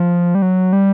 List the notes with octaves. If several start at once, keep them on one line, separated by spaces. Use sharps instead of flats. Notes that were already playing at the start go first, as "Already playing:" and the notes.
Already playing: F3
G3
F#3
G3